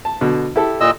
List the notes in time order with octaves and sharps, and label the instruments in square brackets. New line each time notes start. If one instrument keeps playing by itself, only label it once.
[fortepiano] A5
B2 D3
E4 G4 A4
[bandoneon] A#2 D#5 E6